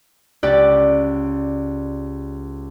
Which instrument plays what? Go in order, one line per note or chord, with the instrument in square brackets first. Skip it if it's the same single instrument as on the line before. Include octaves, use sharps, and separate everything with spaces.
[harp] C#2 G4 D5 F#6 A6